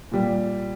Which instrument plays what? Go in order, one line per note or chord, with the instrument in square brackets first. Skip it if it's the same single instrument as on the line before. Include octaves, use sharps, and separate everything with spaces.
[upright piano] A#2 G3